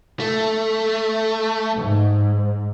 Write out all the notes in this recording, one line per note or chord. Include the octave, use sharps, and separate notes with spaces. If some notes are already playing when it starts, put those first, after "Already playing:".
A3
G#2